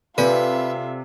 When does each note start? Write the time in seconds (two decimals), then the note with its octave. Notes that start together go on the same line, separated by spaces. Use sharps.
0.18 C3 F4 A4 B4 D5 E5 G#5